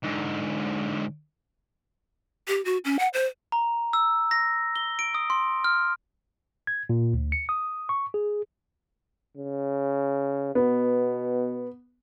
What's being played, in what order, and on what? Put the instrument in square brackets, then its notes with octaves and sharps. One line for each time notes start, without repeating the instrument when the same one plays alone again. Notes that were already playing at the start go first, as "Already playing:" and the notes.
[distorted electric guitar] G#2 D3
[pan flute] G4
F#4
C#4
F#5
C5
[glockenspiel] A#5
E6
A#6
G7
D7
D#6
C6
F6
[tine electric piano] G#6
A#2
D2
C#7
D#6
C#6
G#4
[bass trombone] C#3
[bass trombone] B2 [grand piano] B3